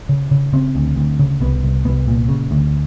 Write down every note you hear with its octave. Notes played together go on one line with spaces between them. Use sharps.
C#3
C#3
C#3 C4
D2
D2
C#3
C2 B3
C2
C2 B3
A#2
C#3
D2